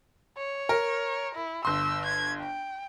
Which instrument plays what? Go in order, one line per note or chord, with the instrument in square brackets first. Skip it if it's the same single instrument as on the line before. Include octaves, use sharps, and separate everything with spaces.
[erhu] C#5
[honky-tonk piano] A#4
[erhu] E4
[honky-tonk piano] G1 C6 [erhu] E6
[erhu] G#6
G5